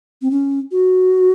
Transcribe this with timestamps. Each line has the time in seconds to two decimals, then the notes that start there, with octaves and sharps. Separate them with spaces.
0.22 C4
0.31 C#4
0.71 F#4